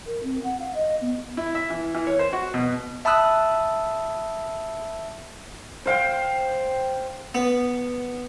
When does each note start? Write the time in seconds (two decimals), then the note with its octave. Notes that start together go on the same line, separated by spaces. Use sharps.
0.07 A#4
0.23 C4
0.44 F#5
0.60 F5
0.75 D#5
1.01 B3
1.37 E4
1.55 E5
1.70 E3
1.95 E3
2.07 C#5
2.19 C5
2.33 F#4
2.54 B2
3.05 E5 A5 B5 D#6 E6 F#6
5.86 C5 F5 G5
7.35 B3